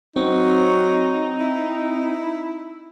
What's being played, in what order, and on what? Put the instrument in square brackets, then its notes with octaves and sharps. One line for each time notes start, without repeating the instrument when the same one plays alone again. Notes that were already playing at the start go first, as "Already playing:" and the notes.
[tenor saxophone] F#3 [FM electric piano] C4 [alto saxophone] D#4
[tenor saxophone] E4